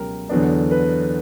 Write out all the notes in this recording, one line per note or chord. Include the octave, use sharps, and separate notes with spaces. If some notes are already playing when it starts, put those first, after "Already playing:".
Already playing: C#2 B2 F#3 C#4 G4 A#4
E2 D3 F#3 B3 D4
B4